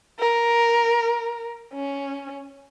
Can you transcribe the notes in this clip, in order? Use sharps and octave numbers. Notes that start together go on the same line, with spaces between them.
A#4
C#4